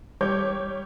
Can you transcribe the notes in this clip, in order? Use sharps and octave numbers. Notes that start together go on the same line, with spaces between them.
G3 C#5 D6 G6